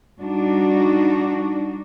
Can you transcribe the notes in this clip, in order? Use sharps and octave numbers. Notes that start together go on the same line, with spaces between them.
G3 D4 D#4 F#4